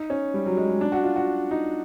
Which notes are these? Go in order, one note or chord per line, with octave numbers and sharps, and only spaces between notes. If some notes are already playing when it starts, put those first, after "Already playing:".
Already playing: D#4
C#4
G3
F#3
G#3
G#3
D4
F#4
F4
F#4
D#4